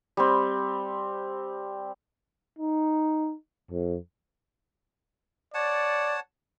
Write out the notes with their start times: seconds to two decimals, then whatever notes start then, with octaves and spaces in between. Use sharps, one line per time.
0.17 G3 C4
2.58 D#4
3.71 F2
5.54 C#5 D5 F#5 A5